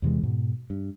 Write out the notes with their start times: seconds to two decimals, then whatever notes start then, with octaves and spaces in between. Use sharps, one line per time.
0.02 E2 C3 E3 G#3
0.23 G#2 B2
0.70 G2